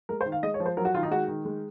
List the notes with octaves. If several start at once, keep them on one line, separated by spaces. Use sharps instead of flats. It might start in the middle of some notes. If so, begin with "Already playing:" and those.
G#3 A#4
C5
D#3
F5
G#3 D#5
C#5
F3
C5
F#3 A#4
F#4
D#3 F4
D#4
G#3 F#4
D#3
G#3